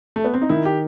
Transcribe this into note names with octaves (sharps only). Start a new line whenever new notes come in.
A3
B3
C4
D#4
D#3 E4
G4